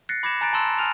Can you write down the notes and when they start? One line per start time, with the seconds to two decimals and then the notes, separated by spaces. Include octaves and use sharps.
0.09 F#6 A6 A#6 C7 C#7
0.23 B5 D6 G#6 A#6 C#7 E7
0.41 G#5 A#5 F#6 A6 D7
0.53 A5 B5 C6 E6 E7
0.79 G#5 F6 F7